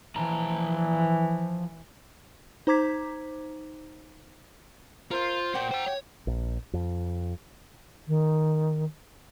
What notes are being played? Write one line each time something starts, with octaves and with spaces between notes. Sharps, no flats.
E3 F3 A5 A#5
D#4 C5 A#5 D6 G#6 B6
F4 A#4 C5 F5
A#2 A#3 F#4 G4 G5
C5 A#5
C#5
A#1
F2
D#3